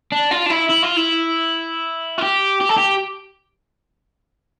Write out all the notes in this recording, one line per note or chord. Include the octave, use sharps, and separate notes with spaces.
D4
F4
D4
E4
E4
F4
E4
F4
G4
G4
A4
G4